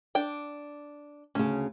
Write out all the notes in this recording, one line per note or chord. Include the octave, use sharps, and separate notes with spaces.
D4 G5
D2 C#3 C#4